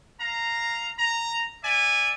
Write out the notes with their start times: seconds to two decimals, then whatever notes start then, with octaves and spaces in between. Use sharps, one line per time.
0.20 F5 A#5
0.97 A#5
1.64 D5 E5 G#5